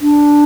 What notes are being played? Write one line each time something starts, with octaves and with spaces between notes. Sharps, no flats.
D4